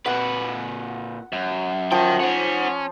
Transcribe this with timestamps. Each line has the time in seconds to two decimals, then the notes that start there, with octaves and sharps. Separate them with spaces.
0.06 A#2 B4 F#5
1.32 F#2
1.92 F3 A#4 G5
2.20 C#4 C5 F#5